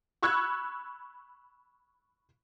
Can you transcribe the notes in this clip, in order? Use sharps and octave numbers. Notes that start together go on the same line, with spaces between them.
B5 C#6 E6 F#6 G#6